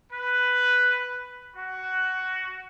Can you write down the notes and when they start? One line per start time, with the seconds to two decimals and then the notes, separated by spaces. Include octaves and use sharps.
0.11 B4
1.55 F#4